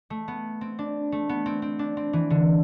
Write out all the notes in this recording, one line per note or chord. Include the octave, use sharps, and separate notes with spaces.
A3
B3
C4
D4
A3
B3
C4
C4
D4
C4
E3
D3